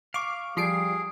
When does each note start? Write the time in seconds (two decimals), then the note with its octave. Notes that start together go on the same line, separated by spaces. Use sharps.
0.14 F5 C#6 D6
0.57 F3 G3 G#4 C7 D7